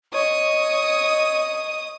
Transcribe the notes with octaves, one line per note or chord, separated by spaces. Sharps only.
C#5 D#5 D#6